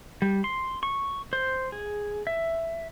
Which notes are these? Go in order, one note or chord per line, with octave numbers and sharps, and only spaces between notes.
G3
C6
C#6
C5
G#4
E5